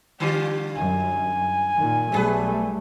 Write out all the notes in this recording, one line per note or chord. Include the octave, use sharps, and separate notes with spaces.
D3 G3 F4 G4
F#2 G#5
A#2 D#3
B1 C3 G3 A3 G#4 B4